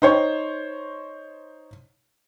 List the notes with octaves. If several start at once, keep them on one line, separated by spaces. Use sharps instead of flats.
D#4 C5 C#5